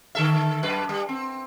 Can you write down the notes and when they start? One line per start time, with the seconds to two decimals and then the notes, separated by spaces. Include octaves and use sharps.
0.15 D3 A4 E5
0.63 F#2 B4
0.89 G3
1.09 C4